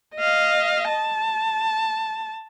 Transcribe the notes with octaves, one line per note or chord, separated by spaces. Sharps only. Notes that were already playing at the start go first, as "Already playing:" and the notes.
D#5 F5
A5